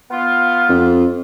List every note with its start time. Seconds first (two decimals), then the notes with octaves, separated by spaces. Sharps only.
0.11 B3 F4
0.69 F2